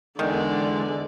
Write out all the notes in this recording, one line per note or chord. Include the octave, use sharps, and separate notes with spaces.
E2 D3 D#3 G#3 D5